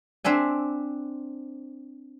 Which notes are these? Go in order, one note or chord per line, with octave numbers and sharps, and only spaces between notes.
C4 D4 E5 G#5